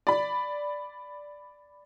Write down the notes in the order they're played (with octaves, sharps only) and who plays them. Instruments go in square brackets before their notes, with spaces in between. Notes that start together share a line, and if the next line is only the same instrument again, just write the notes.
[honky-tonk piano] D5 B5